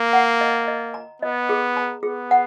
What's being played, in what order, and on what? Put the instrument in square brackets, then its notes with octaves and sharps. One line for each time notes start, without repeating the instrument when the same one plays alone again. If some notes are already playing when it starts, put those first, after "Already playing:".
Already playing: [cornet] A#3
[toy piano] F#5
D#5
D#5
A#5
[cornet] B3 [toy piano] D#5
[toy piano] G#4
A#5
[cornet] B3 [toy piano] G#4
[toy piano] F#5